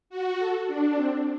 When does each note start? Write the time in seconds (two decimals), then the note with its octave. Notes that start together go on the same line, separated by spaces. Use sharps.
0.10 F#4
0.39 A4
0.68 D4
0.96 C4